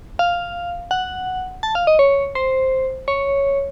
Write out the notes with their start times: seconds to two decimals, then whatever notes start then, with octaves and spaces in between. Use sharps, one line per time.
0.19 F5
0.91 F#5
1.63 A5
1.75 F5
1.87 D#5
1.99 C#5
2.35 C5
3.08 C#5